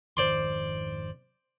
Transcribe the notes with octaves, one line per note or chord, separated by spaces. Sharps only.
G#1 F2 D#3 C5 D5 C6